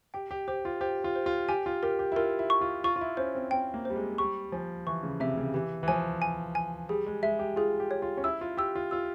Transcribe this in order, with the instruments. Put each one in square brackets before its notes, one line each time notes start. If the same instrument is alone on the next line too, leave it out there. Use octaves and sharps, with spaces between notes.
[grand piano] G4 [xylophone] G5
[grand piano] G4
[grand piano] G4 [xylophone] C5
[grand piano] F4
[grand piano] G4 [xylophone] C5
[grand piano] F4
[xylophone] C5
[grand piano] F4
[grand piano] G4 [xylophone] G#5
[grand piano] F4
[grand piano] G4 [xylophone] A#4
[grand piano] G4
E4
[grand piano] F4 [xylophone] A#4
[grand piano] E4
[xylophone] C#6
[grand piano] F4
[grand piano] F4 [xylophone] C#6
[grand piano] F4
E4
[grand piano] C#4 [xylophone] C5
[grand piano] C4
[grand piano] C4 [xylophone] G5
[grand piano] A#3
[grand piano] G3 [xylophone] C5
[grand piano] G#3
[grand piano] G3 [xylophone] C#6
[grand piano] F3 [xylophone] G#5
[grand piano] E3 [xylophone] C#6
[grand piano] C#3
[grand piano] C3 [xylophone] E5
[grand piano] C#3
[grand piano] E3 [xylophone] G4
[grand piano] E3
[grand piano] F3 [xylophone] G#5
[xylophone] G#5
G#5
[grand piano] G3 [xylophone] G#4
[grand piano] G#3
[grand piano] G#3 [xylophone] E5
[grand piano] G4
[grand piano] F4 [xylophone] G#4
[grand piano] G4
[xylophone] C#5
[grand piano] F4
C#4
[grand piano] E4 [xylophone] E6
[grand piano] F4
[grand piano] G4 [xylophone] E6
[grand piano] F4
[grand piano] F4 [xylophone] E6